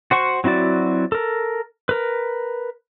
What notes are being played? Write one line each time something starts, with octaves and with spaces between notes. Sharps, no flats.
F#4 C5 F#5 C#6
F#3 C4 E4 F#4 D5
A4 A#4
A#4 B4